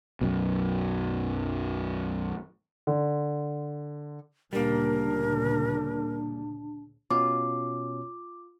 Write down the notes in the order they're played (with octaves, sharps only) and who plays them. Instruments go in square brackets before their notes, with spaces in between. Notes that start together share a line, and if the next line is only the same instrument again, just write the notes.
[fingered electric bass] B1 F#2 B2
[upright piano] D3
[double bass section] D2 A#2 C#3 [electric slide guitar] G3 A#3 [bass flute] D4 [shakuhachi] A#4
[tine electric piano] B2 C#4 [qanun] F4 [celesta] D6